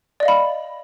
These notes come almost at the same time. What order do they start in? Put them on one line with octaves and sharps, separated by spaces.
D5 D#5 F5 B5